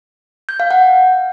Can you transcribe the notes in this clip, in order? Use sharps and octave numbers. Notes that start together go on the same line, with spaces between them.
G6
F5
F#5